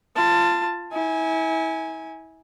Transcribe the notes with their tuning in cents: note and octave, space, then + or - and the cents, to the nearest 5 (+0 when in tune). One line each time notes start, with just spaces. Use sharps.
F4 -15 A5 +15
E4 -30 G#5 +0